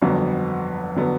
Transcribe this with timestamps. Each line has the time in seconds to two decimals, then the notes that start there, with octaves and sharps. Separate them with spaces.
0.02 G1 F2 D3 F#3 B3
0.96 D3 F#3 B3